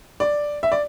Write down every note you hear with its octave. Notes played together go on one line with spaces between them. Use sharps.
D5
E5
D5